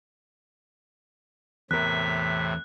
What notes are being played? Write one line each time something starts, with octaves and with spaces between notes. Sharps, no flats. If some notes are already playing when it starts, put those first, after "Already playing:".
E2 A2 C3 A#4 F#6 B6